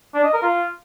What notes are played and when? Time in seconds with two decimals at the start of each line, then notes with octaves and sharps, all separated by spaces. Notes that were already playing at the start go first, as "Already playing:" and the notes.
0.14 D4
0.24 D#5
0.33 A#4
0.43 F4